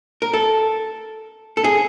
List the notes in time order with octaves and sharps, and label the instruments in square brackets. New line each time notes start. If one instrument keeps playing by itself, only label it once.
[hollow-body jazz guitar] A#4
A4
A4
G#4